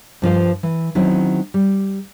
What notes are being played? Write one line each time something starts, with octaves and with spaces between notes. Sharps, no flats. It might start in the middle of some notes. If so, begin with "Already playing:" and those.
G2 F3 F4 C5
E3
D#3 F#3 C4 C#4 E4
G3